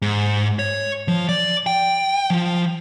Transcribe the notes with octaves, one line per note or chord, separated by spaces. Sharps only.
G#2
C#5
F3
D5
G5
F3